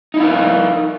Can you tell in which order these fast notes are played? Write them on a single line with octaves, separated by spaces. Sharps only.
D#4 E4 F5 A#4